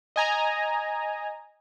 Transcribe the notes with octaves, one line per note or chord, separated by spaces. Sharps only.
D#5 G#5 A#5